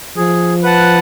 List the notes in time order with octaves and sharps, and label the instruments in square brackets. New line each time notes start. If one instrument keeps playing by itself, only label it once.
[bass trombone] F3 [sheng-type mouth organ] G#4
[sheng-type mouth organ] B4 F#5 A5